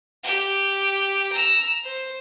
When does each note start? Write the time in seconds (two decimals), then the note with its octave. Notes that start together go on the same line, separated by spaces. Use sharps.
0.24 G4
1.32 A#5 E6
1.84 C5